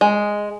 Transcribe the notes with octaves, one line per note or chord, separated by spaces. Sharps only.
G#3